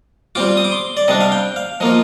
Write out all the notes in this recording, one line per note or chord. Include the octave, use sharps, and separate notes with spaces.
G3 C4 F4 D6
D#6
D6
C6
D5
C3 G3 D4 D#5
F5
G5
F5
F3 A#3 F4 D#5